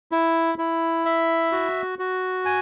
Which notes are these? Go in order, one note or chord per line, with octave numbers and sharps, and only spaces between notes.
E4
E4
E5
F#4
F#4
G#5